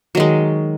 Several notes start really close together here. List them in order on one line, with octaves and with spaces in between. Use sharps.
F#3 D#3 G#3